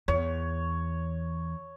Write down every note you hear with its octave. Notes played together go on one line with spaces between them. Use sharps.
E2 C#5